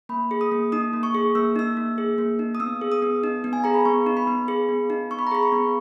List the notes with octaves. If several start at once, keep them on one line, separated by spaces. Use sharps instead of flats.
A#3 B5
G#4
D#6
A#3
D#4 D#6
A#3
C#6
G#4
A#3 E6
D#4 E6
A#3
G#4
A#3
D#4
D#6
B3 E6
G#4
D#6
B3
D#4
B3
G#5
G#4 A#5
B5
B3 C#6
D#4
B5
B3
G#4
B3
D#4
B3 C#6
B5
A#5
G#4 B5
C#6
B3